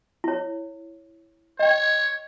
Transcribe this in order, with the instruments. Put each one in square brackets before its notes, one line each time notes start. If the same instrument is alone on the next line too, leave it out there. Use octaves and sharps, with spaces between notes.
[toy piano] E4 C#5
[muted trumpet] C#5 [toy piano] D#5 G5